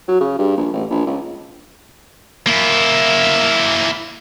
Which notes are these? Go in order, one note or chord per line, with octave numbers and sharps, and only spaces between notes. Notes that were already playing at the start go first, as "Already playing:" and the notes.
F#3
C#3
G2
A#1
A1
A#1
C#2
A#3 E4